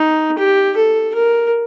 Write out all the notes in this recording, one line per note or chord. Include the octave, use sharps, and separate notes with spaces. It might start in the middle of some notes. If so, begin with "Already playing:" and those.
Already playing: D#4
G4
A4
A#4